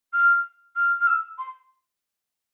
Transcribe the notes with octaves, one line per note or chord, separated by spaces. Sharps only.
F6
F6
F6
E6
C6